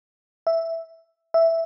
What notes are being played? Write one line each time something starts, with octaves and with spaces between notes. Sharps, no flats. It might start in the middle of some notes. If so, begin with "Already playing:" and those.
E5
E5